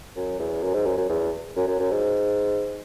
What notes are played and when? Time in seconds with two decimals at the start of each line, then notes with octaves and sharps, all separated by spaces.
0.16 F#2
0.39 E2
0.63 F#2
0.74 G#2
0.86 F#2
0.97 F#2
1.09 E2
1.56 F#2
1.67 F#2
1.79 F#2
1.91 G#2